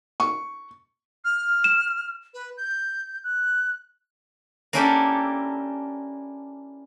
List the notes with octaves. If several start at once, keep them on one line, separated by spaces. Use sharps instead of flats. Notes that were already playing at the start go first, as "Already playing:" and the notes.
C#6
F6
E7
B4
G6
F#6
A#3 C#4 D4 E4 G4 A4